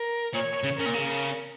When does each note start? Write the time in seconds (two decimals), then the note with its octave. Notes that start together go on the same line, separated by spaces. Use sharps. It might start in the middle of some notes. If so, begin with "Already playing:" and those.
Already playing: A#4
0.34 A#2 C#5
0.64 C#3
0.78 C#3 A#4
0.86 A#2
0.94 C#3